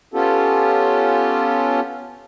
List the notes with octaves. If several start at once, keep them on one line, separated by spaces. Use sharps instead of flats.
B3 C#4 F4 G4 A4